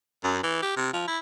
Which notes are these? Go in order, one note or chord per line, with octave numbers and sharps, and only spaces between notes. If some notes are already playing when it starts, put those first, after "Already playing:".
F#2
E3
G4
C3
F3
E4